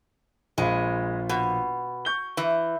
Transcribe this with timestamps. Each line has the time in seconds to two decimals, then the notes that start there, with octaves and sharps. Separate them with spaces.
0.58 A#1 G#3 F4 B5
1.29 B2
2.05 C#6 G6 G7
2.37 E3